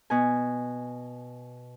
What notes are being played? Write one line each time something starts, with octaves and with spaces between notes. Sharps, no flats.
B2 G#5